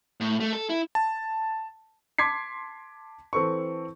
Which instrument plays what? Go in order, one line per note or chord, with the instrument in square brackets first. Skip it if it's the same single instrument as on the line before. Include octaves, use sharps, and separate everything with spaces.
[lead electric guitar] A2
A3
A4
E4
[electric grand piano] A5
[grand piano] A5 C6 D6 G#6 B6 C7
E3 C4 A4 B4 C#6